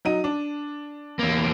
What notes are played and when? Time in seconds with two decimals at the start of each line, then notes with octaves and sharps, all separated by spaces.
0.05 F#3 D#4 D#7
0.24 D4
1.19 E2 A#3